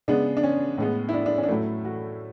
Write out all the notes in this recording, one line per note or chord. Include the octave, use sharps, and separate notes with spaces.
C#3 G#3 B3 D4
D4
C#4
A2 G#3 B3
E4
D4
D4
C#4
D4
A2 F#3 A3 E4
F#4